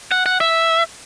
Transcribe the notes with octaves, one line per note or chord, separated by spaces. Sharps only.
F#5
F#5
E5